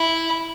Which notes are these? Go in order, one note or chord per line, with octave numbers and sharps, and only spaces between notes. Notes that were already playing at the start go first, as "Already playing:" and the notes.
Already playing: E4